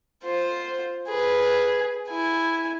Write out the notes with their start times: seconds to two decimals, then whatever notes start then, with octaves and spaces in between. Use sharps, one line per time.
0.23 F4 C5
1.08 G#4 B4
2.09 E4 G#5